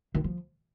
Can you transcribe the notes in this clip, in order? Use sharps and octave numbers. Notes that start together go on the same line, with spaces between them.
D#3
F3